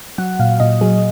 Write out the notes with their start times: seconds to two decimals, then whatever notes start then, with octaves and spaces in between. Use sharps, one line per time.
0.18 F#3 F#5
0.39 A#2 F5
0.60 A#2 D#5
0.81 F#3 G#4